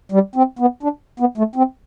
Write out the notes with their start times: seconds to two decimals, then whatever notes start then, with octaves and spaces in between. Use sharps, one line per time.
0.12 G3
0.35 C4
0.59 B3
0.83 D4
1.20 B3
1.38 A3
1.56 C4